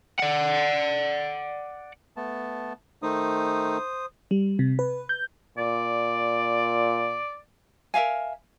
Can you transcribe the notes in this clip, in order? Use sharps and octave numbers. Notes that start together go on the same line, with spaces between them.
D5 F#5
A3 B3 A5
D#3 A3 D#4 C5 D#6
G3
C3
B4
G6
A#2 D5
A#4 E5 F5 G#5